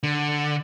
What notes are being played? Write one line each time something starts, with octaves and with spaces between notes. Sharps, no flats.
D3